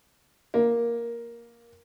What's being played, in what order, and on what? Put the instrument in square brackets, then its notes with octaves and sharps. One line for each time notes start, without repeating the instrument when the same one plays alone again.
[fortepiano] A#3